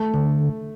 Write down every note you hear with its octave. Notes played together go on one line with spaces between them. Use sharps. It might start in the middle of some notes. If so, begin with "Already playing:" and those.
Already playing: A3
D3